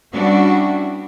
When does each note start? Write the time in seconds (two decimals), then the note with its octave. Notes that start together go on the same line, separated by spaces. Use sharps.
0.14 G3 B3 C#4 D4 E4 F#4